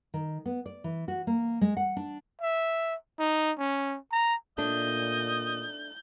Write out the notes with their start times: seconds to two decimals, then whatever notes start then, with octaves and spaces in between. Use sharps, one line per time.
0.14 D#3
0.46 B3
0.66 D5
0.84 E3
1.08 F#4
1.27 A#3
1.61 G#3
1.77 F#5
1.97 D4
2.41 E5
3.19 D#4
3.58 C#4
4.12 A#5
4.58 A#2 A3 D4 D#5 G6